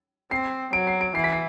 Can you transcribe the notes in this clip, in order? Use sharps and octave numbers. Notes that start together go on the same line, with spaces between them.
C4 C7
F#3 D7
C7
D7
E3 C7
B6
C7